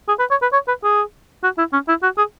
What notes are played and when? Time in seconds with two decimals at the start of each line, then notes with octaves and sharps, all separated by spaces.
0.08 G#4
0.19 B4
0.31 C#5
0.42 B4
0.53 C#5
0.68 B4
0.84 G#4
1.43 F#4
1.58 E4
1.73 C#4
1.88 E4
2.03 F#4
2.18 G#4